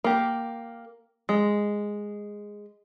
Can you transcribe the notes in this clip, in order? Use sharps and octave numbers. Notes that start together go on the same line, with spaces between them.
A#3 G4
G#3